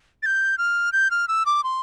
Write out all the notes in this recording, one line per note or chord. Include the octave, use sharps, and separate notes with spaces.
A6
G6
F6
G6
F6
E6
D6
C6